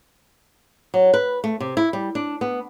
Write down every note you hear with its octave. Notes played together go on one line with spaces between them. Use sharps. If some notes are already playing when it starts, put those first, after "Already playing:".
F#3
B4
A3
C3
E4
G3
D4
B3